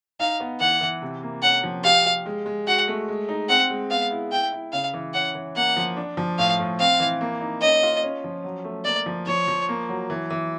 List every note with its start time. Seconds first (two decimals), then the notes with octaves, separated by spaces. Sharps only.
0.20 D#4 F5
0.40 B3
0.60 E3 F#5
0.81 E3
1.02 C3
1.23 A#3
1.42 C#4 F#5
1.63 F3
1.84 G4 F5
2.05 G4
2.26 G#3
2.46 G#3
2.67 F#4 F#5
2.88 A3
3.08 G#3
3.29 D#4
3.49 C4 F#5
3.70 G#3
3.90 B3 F5
4.11 E4
4.32 E4 G5
4.53 E4
4.73 C#3 F5
4.94 E3
5.14 C#4 F#5
5.35 E3
5.56 A#3 F#5
5.77 F3
5.97 D4
6.17 F3
6.38 A2 F5
6.59 A2
6.79 C4 F5
7.00 E3
7.21 A#3
7.41 D#4
7.61 C#4 D#5
7.83 F4
8.03 C#4
8.24 F3
8.44 F#3
8.64 A3
8.85 A#3 D5
9.06 F3
9.26 F3 C#5
9.48 F3
9.69 A#3
9.89 F#3
10.10 E3
10.30 E3